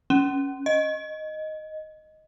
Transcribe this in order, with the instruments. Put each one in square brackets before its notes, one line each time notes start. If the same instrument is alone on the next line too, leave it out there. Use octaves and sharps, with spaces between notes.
[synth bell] C#4
D#5